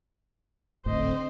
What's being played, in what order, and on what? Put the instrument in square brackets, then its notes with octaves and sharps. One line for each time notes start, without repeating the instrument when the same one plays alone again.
[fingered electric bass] D#1 G#1 A2 [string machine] D3 C4 [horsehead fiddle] C5 D#5